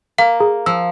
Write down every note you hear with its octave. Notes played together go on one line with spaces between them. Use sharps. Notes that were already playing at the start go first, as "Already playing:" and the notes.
A#3 F5
G#4 A#5
F3 E6